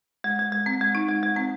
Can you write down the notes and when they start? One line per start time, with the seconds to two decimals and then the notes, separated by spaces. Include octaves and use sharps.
0.24 G#3
0.39 G#3
0.52 G#3
0.66 C4
0.81 G#3
0.95 D#4
1.09 G#3
1.23 G#3
1.36 C4